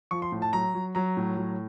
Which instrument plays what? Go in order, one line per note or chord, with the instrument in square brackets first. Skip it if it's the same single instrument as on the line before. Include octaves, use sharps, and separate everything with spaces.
[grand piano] F3 C#6
C6
A2
A5
F#3 A#5
F#3
F#3 A#5
A2
F#3